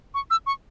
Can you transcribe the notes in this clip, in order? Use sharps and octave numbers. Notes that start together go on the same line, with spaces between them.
C#6
E6
C#6